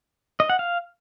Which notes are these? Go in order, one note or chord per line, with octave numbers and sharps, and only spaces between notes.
D#5
F#5
F5